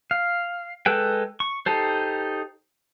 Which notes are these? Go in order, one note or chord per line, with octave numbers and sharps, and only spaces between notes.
F5
G#3 A4 B4 G5
C#6
D#4 G4 A4 C5